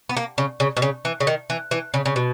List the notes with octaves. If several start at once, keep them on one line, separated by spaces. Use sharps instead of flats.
B3
A#3
C#3
C#3
B2
C#3
E3
C#3
D#3
E3
E3
C#3
C#3
B2